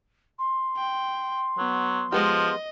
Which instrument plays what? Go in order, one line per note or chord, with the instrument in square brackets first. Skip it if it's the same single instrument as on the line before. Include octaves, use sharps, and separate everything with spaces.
[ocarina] C6
[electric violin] G5
[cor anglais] F#3 [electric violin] B3
[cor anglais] F3 [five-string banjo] G#3 B3 G4 [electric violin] D#5